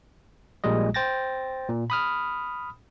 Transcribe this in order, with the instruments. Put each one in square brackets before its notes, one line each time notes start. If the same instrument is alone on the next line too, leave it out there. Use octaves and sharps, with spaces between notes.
[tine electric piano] A#1 A#2 G3 G#3 D#5
C5 G5 A6 A#6
A#2
B5 D#6 F6